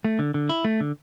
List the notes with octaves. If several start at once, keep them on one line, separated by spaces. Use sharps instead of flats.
A3
D3
D3
E4
A3
D3